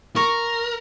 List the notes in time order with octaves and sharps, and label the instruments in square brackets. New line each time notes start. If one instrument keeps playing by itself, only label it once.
[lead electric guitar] A#4 [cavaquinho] C#6